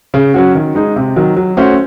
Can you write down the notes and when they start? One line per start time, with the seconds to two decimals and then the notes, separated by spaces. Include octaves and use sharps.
0.14 C#3
0.34 F#3 C#4 F#4
0.55 D#3
0.75 G#3 D#4
0.96 C3
1.16 D#3 F#3
1.36 F#3
1.57 A3 C#4 F#4 C5